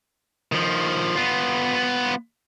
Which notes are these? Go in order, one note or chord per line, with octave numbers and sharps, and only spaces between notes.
D#3 F3
B3 F4